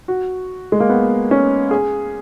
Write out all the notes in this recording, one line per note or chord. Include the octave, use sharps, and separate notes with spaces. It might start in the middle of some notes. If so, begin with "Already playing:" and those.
F#4
G#3
A#3
B3
C#4
G#4